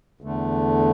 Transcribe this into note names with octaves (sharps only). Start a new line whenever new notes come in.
E2 D3 A3